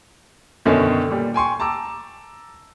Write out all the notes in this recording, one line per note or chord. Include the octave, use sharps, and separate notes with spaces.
F#2 B2 D3 D#3 C#4
A#2 G3
G5 G#5 C6 C#6
A5 A#5 D6 E6